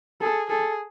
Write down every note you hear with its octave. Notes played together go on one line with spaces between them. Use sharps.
G#4 A4
G#4 A4